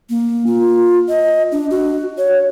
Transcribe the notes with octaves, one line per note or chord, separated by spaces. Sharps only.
A#3
F4
D#5
D4
F#4
C#5